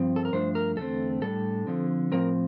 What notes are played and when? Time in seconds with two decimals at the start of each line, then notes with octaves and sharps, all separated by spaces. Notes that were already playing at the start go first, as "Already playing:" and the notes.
Already playing: G2 F3 C4
0.16 A4
0.25 A#4
0.32 G2 F3 A3 D4 C5
0.55 A#4
0.77 E2 D3 A3 C4 A4
1.22 A2 G3 D4 A4
1.67 D3 F3 C4
2.12 A2 F3 C4 A#4